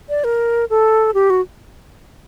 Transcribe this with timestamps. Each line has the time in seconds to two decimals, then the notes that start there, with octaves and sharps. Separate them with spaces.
0.09 D5
0.24 A#4
0.70 A4
1.14 G4
1.30 F#4